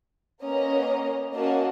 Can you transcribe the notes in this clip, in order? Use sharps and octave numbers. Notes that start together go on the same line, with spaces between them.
A#3 B3 C#4 D#5 A#5
A#3 C#4 F#4 D#5 A5